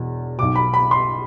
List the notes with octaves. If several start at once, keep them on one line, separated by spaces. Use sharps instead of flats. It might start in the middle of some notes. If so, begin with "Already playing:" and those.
Already playing: E1 E2 B2
B1 B2 D6
B5
B5
C6